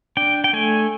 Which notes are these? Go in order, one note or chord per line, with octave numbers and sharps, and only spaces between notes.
D4 G5
G5
A3 G#5